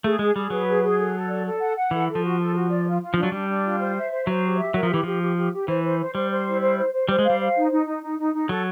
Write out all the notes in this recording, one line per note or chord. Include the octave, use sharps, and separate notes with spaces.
A3 G#4
G#3 G#4
G3 G#4
F#3 B4
G#4
G#4
A4
A4
D5
A4
F#5
F#5
E3 A4
A4
F3
F#4
A4
F#4
D5
F4
F4
F3 D4
F#3
G3 D4
D4
F4
C5
E5
C5
F#3 C5
G4
E5
F#3 A#4
F3
E3 G4
F3 G4
G4
G4
G4
E3 C5
C5
C5
G3 C5
C5
E4
C5
C5
C5
G3 C5
G#3
F5
G3
C5
D#4
D#4
D#4
D#4
D#4
D#4
F#3 A4